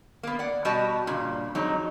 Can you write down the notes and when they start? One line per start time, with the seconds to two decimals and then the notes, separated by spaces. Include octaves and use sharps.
0.23 A#3 B3
0.39 D5 F#5
0.65 B2 G3 F#4 G4 D#5 A5
1.07 G2 A#2 C#3
1.55 F2 F#3 G#3 D#4 F#4